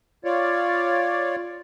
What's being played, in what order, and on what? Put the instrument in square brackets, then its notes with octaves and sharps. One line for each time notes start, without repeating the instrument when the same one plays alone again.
[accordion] F4 C#5 D5